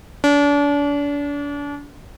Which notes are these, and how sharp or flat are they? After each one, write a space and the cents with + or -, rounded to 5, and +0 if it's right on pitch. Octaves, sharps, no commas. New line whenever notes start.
D4 -35